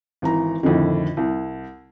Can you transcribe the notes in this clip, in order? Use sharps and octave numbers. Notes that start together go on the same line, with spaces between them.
G#1 E3 A#5
F2 A2 D3 D#3
C2